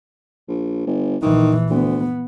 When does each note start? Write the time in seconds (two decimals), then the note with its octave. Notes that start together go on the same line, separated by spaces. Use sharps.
0.49 A#1
0.87 G1
1.22 A#1 D#3 E3
1.70 D2 B3